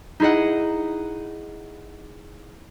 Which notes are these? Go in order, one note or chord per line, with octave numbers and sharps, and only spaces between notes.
D#4 E4 G#4 D#5 F#5